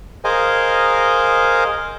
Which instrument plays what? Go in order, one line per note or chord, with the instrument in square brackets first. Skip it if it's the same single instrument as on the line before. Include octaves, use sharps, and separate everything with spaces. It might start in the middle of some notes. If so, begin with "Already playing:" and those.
[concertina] G#4 A#4 C5 D#5 F5 G#5